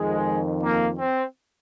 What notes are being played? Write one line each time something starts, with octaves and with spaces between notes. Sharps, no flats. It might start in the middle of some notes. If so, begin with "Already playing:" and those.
Already playing: F2 D#3 G#3
A#3
C4